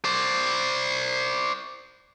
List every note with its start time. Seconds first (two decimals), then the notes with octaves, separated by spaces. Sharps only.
0.05 C5 D5